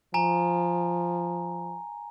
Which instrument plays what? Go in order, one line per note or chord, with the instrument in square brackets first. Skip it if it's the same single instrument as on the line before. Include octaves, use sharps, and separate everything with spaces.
[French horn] F3 [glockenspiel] G#5 A#5